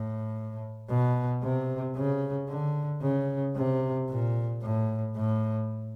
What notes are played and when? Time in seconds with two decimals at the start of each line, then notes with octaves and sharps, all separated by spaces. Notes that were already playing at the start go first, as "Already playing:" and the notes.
Already playing: A2
0.90 B2
1.43 C3
1.96 C#3
2.49 D3
3.02 C#3
3.56 C3
4.09 A#2
4.63 A2
5.16 A2